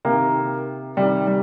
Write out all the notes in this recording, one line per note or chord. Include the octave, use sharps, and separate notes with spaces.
C3 D#3 A#3
C3 D#3 G3
G3